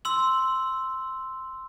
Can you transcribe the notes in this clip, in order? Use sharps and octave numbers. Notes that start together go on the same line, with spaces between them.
C6 E6 F#7